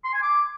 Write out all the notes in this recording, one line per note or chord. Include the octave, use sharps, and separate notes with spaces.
C6
G#5
D6